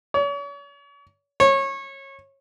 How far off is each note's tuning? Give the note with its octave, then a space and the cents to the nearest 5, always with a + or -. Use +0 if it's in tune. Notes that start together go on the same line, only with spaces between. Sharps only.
C#5 +40
C#5 -25